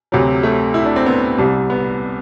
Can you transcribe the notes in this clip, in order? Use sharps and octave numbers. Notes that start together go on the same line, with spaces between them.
D2 C3 F#3
A3
E4
D4
C4
B3
C2 C3 G3
B3